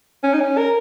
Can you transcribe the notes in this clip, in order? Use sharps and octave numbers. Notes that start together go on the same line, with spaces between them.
C#4
D#4
C#4
A#4